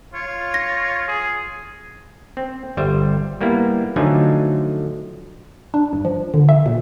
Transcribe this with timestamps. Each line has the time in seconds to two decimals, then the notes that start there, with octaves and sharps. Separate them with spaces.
0.14 F4 C#5
0.54 A#6
1.08 G#4
2.37 C4
2.77 G1 G3 C5 E5
3.41 G3 A#3 B3 E4
3.96 D3 F3 F#3 A3 D#4 G#5
5.74 D4
5.93 G2
6.05 F3
6.34 D3
6.49 E5
6.66 A#2